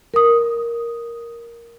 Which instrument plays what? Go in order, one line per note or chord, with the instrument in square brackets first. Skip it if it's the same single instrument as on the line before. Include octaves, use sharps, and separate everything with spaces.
[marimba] A#4 D#6